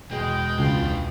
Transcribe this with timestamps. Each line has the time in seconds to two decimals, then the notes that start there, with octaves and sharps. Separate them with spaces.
0.11 E2 B2 G#3 G5
0.59 C#2 D4 F4